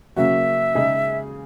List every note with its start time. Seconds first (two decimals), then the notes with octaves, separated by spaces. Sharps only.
0.16 C#3 F#3 A#3 C#4 F#4 E5
0.75 C#3 G#3 D#4 G#4